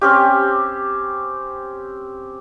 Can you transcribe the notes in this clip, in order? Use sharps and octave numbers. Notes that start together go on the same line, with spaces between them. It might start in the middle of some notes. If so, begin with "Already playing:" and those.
C4 C#4 G4